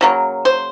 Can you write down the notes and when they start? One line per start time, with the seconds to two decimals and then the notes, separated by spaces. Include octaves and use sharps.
0.01 C#3 F#3 A#3
0.45 C5